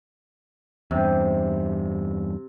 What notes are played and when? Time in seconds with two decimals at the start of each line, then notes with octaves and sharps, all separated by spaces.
0.91 E2 G2 C3